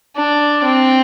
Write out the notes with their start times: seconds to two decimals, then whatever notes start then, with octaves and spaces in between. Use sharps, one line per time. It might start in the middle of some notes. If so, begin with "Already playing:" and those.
0.16 D4
0.64 C4